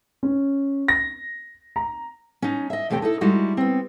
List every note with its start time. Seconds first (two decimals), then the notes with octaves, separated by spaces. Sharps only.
0.23 C#4
0.88 A#6
1.76 A#5
2.42 C#4 D#4
2.70 D#5 E5
2.90 E2 C3 A3 G4 C#5 G5
3.02 D#4 E4 A4
3.21 G3 G#3 D#4 E4 F#4
3.57 B3 C4